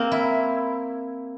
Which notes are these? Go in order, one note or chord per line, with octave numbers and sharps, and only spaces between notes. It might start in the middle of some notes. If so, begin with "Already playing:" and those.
Already playing: A#3 C4
E4